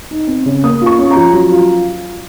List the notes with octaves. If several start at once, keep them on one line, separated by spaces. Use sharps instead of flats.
D#4
C4
C#3
A#3 D#6
F4 C#6
C#4
A#5
F3
F#3
F4